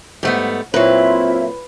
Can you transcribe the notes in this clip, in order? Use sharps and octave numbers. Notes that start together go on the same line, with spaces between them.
G#2 G3 A3 B3
A#2 F#3 C4 E4 F4 B4 C5 E5